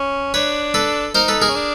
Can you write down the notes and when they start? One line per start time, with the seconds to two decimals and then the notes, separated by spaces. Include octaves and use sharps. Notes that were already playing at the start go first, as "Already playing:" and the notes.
Already playing: C#4
0.34 D4 B4 C#5
0.74 A4 B4
1.14 D#4 A#4 C5
1.28 A4 B4
1.42 G#4 A#4
1.49 C#4
1.55 D4